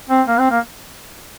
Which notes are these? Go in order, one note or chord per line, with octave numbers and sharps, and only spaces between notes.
C4
A#3
C4
A#3